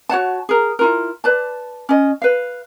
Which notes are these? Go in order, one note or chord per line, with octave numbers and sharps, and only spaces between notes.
F#4 C#5 F#5 A5
G#4 A#4
E4 F4 A#4
B4 D5 A5
C#4 D#5
B4 F5